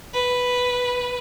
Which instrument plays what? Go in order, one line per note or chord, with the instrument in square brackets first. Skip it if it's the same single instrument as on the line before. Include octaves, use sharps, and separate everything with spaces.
[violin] B4